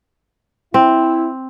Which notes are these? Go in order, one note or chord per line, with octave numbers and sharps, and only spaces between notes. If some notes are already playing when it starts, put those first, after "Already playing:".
C4 E4